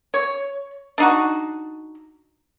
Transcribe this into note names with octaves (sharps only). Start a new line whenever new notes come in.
C#5
D4 D#4 F#4